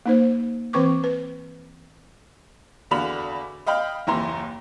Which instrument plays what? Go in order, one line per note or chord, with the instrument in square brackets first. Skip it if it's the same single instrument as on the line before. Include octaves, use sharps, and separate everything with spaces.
[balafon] A#3 D#4 C5
E3 C4 B4 C#6 D6
B4
[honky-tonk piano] E2 D3 F#4 F5 B5 F7
D#5 F5 G5 B5 F6
F#1 D#2 E3 A#5 C6